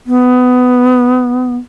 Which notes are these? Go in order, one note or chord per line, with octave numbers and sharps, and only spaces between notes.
B3